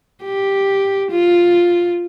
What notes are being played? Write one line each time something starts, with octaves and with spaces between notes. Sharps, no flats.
G4
F4